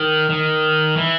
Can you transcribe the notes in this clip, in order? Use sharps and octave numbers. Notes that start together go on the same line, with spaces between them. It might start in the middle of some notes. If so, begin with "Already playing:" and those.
Already playing: D#3
D#3
E3